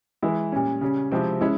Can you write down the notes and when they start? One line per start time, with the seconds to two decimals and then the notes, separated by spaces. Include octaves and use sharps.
0.22 E3 G#3 E4
0.52 A#2 G3 C#4
0.81 C#3 G3 C#4
1.12 C3 F3 G#3 C4 E4
1.41 G#3 C#4 E4